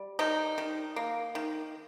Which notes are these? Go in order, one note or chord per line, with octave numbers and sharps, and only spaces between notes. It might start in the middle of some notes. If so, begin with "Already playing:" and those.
Already playing: G3
D#3 D#4
D#3
A#3
D#3